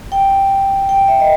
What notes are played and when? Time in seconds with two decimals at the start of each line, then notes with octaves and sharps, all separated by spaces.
0.12 G5
0.89 G5
1.08 E5
1.20 D#5